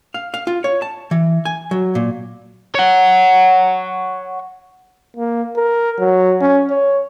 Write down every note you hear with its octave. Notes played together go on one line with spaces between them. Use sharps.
F5
F5
F4
C#5
A5
E3
G#5
F#3
A#2
C#5 F#5
A#3
A#4
F#3
C#4
C#5